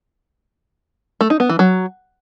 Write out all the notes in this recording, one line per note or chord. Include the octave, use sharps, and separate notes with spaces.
A3
D#4
B3
E3
F#3